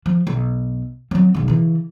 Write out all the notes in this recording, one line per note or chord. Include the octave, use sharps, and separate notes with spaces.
F3
B1
F#3 C4
F#1 B1
C#3 E3